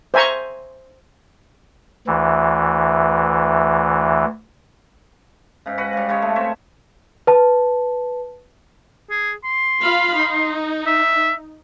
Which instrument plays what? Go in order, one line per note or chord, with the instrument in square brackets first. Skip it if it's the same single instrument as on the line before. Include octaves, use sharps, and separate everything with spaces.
[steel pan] C5 E5 G#5 A#5 C#6
[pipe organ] D2 E3
[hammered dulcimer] G#2 C#3
F#4 B4 F#5
C#3 G3
C#3 G3 G#3 C#5
A3
C4 C#5 E5
[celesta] B4 A5
[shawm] G#4
C6
[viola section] F4 F5 B5
D#4
[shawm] E5